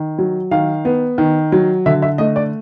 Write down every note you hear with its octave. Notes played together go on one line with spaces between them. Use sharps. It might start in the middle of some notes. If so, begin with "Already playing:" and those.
Already playing: D#3
F#3
D#3 F5
B3
D#3
F#3
D3 E5
E5
A3 D#5
D5